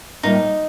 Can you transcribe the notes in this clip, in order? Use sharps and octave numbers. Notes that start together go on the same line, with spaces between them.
A2 G3 A#3 D#4 F4